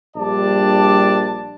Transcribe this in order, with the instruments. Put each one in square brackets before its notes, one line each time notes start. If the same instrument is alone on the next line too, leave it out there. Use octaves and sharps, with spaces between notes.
[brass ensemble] A#1 G3 D4 D5 A5